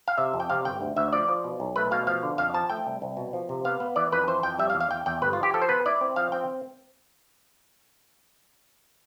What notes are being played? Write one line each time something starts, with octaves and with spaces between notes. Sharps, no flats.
F5
C3 E5
F2
G5
C3 F5
G1 G5
D2
D2 E5
F3 D5
F3
B2
B1
A3 B4
B2 F5
F3 F5
D3
F2 F5
F3 A5
A3 G5
C2
C2
B2
F3
C3
B3 F5
B3
E3 D5
F2 B4
E3 C5
F2 G5
G3 E5
F5
E2
F5
E2 G5
E2 G5
G1 B4
F4
F3
G4
F3 A4
C5
B3 B4
E4 D5
C4
F3 F5
C4 G5